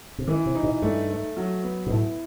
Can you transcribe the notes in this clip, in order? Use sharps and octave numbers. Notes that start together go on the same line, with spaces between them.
C3
D#3 E3
C3
D#4
B2
G2 A3
A3
F#3
B3
B2
A2 E4